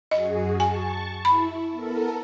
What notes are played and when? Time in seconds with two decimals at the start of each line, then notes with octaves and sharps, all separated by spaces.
0.11 F#2 F#4 G#4 D#5
0.60 G#5 A5 C#6
1.25 E4 B5
1.70 B3 A4 A#4